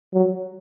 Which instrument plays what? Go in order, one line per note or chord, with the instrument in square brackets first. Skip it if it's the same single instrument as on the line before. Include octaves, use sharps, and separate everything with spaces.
[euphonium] F#3